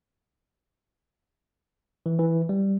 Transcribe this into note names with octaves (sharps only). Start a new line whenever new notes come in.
E3
E3
G3